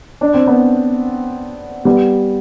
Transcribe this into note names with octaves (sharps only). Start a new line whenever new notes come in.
D4
C4
B3 D4
G3 B3